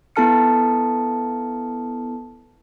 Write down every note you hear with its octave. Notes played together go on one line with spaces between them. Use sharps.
B3 E4 A4 A5 F6 C#7